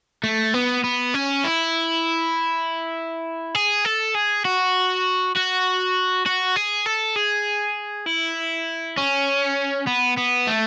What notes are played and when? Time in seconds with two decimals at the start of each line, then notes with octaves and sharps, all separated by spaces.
0.24 A3
0.54 B3
0.84 B3
1.14 C#4
1.44 E4
3.55 G#4
3.85 A4
4.15 G#4
4.45 F#4
5.36 F#4
6.26 F#4
6.56 G#4
6.86 A4
7.16 G#4
8.06 E4
8.97 C#4
9.87 B3
10.17 B3
10.47 A3